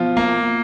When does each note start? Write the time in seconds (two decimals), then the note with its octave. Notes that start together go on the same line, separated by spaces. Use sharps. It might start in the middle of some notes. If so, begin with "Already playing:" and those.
Already playing: B2 F3 F4
0.17 A#3